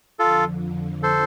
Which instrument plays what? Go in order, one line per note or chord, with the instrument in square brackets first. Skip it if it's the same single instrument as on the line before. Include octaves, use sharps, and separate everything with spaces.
[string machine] F2 D3 F3 [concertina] F4 A4
[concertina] A4 C5